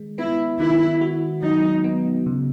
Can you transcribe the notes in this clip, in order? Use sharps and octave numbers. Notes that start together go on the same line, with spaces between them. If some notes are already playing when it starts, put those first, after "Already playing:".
Already playing: D#3 G#3
B3 E4
D#3 E4
F#4
F#3 D#4
B3
C#3